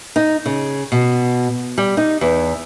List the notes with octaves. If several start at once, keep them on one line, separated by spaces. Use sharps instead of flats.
D#4
C#3
B2
G3
D#4
E2